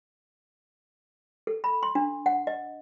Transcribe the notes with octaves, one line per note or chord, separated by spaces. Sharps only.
A4
B5
C6
D4
F#5
D#5